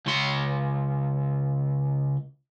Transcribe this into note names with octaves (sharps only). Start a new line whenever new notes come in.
C#2 C6